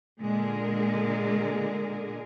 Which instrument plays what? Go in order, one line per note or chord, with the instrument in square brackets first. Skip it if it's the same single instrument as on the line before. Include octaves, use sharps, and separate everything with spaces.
[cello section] A#2 D3 G#3 G#4 A#4